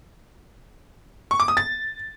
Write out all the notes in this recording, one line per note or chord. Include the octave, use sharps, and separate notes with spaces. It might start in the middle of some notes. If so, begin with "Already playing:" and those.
C#6
D6
D#6
A6